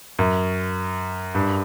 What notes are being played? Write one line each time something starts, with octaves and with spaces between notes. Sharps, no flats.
F#2
G2